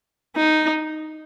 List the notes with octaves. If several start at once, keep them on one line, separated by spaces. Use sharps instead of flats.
D#4